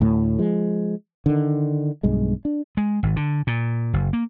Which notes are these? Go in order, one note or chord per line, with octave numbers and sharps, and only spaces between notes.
D2 A2
F3 G#3
D3 D#3
B1 G2 G#3
D4
G#3
G#1
D3
A#2
F#1
A#3